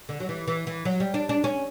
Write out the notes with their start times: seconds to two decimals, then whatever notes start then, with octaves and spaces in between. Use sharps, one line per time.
0.09 D3
0.20 F#3
0.29 E3
0.48 E3
0.67 E3
0.85 F#3
1.00 G3
1.14 D4
1.29 D4
1.44 C#4